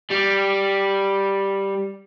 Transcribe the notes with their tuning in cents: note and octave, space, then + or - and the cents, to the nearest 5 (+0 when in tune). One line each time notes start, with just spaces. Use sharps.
G3 +0